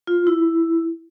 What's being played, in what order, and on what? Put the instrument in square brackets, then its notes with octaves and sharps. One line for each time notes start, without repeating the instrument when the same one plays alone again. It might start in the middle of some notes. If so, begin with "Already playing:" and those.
[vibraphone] F4
E4